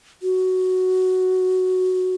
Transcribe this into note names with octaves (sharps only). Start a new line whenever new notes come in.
F#4